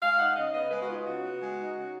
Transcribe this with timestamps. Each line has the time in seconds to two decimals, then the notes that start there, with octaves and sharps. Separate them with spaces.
0.01 G#3 F5
0.19 D#4 F#5
0.36 C#3 D#5
0.54 B3 D#5
0.71 G#3 B4
0.81 F#4
0.88 D#4 F4
1.06 C#3 F#4
1.24 B3
1.41 G#3
1.59 D#4
1.76 C#3